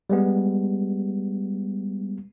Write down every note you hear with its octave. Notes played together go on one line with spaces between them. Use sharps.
G3 G#3 B3